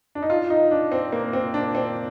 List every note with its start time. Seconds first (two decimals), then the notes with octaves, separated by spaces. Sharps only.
0.15 D4
0.22 D#4
0.30 F4
0.50 D#4
0.71 D4
0.92 C4
1.12 A#3
1.33 C4
1.54 D4
1.75 C4